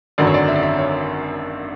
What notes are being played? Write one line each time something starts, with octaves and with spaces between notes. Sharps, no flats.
G#1 F#2 D3 F#3 D5
C#5
D5
E5
D5
E5
C#5